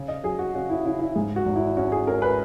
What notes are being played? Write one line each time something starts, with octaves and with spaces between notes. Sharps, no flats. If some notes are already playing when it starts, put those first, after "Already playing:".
Already playing: C#3
D#5
F#3 G#4
F#4
C#3 F#4
E4
C#3 E4
E4
G#2 G#4
F#4
G#1
E4
C#4 F#4
G#4
C#4 A#4
B4